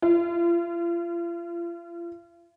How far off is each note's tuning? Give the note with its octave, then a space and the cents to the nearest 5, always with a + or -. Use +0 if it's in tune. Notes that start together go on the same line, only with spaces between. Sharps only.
F4 -35